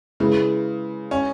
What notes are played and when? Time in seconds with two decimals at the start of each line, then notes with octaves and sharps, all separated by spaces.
0.20 C#3 G#3 E4 B4
1.11 C#4